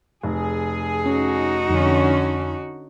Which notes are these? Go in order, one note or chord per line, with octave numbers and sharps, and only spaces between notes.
F1 G#4
C#4 D#4 F#4
F2 D3 C#4